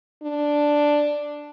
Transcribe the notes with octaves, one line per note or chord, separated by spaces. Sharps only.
D4